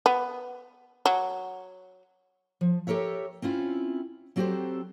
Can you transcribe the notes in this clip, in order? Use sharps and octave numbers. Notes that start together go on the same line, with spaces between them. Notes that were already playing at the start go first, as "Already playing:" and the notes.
B3
F#3
F3
G4 A4 A#4 C#5 E5
C4 C#4 E4 F4
F#3 C4 F#4 G4 A4 C5